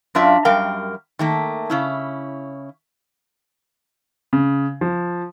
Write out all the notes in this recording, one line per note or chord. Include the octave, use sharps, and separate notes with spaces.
F#2 D4 F4 E5 F5
F#2 G3 A#4 F5 G5
D#3 A3 A#3
C#3 C#4 E4
C#3
F3